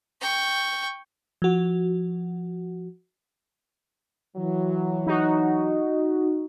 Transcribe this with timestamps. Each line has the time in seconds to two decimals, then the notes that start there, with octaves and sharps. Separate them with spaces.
0.21 G5 C#6
1.42 F3 F#4
4.36 E3 F#3
5.06 D#4 F#4